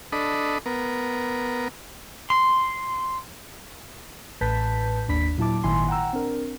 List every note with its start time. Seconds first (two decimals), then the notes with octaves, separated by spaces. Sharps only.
0.12 D4 A4 D#5 B5
0.66 B3 A#4
2.30 C6
4.41 A1 A2 B4 A5 G6 B6
5.08 G1 D#2 D4 B5 B6
5.38 A#2 F#3 E4 A5 D6
5.64 G#1 A#2 D#3 E4 G#5 C6
5.88 F#5 G5 A#5 E6
6.13 C4 D4 A#4